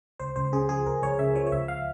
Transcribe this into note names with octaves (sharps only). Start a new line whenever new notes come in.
C#2 C5
C#2 C5
C#3 G#4
F3 G#4
C#2 A#4
C#2 C#5
C#3 E5
F3 C#5
C#5
C#2 E5
F5